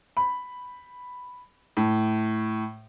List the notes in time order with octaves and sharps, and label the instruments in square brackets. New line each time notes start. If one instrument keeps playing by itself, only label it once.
[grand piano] B5
A2